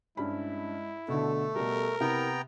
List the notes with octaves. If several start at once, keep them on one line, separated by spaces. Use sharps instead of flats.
G2 G#3 C#4 E4 B5
B2 D3 A3 A4
B2 G3 A#4
C3 B3 E4 G5 A#5